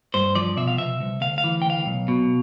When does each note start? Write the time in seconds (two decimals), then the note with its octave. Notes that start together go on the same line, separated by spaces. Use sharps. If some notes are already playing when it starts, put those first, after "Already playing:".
0.14 G2 C5
0.35 F3 D5
0.57 B2 E5
0.68 F5
0.78 B2 E5
1.00 C2
1.21 D2 F5
1.38 F5
1.44 E3
1.62 G5
1.65 D2 F5
1.86 B1
2.08 B2